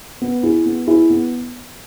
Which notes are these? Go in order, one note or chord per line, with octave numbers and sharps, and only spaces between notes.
B3
E4 G#4
B3
E4 G#4
B3